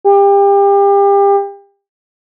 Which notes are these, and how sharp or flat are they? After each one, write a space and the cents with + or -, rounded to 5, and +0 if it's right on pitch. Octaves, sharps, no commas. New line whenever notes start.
G4 +30